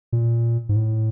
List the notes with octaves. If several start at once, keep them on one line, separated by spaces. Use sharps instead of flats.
A#2
G#2
A2